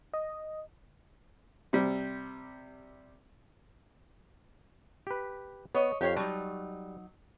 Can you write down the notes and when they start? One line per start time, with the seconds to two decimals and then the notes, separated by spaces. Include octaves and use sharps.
0.14 D#5
1.73 C3 G3
5.07 G4 B4
5.75 B3 C#5 D#5
6.01 F2 G4 C#5 F5
6.16 F#3 G3 D#4 A5